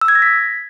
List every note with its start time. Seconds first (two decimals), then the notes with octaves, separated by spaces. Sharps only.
0.01 E6
0.08 G#6
0.15 A#6
0.22 B6